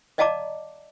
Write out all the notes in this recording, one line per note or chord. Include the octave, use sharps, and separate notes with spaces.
D5 D#5 F5 A5 A#5 D6